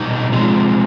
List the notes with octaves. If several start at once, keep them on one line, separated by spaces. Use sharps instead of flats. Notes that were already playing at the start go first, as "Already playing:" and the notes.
Already playing: B2 G3 D#4
C3 F3 G#3